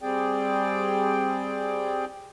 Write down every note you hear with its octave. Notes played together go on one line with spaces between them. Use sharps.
G3 C4 G#4 D5 G5